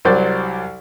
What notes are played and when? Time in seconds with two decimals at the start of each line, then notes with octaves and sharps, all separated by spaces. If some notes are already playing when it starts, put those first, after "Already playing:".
0.05 C2 F#3 C5 D5